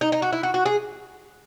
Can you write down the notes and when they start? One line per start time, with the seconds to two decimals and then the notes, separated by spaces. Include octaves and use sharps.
0.01 D#4
0.12 D#4
0.22 F#4
0.33 E4
0.43 F#4
0.54 F#4
0.66 G#4